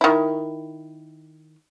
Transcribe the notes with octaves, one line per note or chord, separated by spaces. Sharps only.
D#3 E4